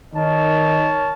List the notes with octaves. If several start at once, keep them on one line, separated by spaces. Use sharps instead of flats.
D#3 A#4 C#5 D#5 A5